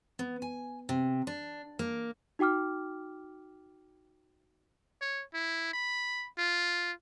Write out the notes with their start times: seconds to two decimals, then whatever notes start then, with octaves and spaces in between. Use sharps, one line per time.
0.19 B3
0.42 G#5
0.89 C3
1.27 D4
1.79 A#3
2.39 D#4 F#4 G5 D6 F6
5.01 C#5
5.34 E4
5.73 B5
6.38 F4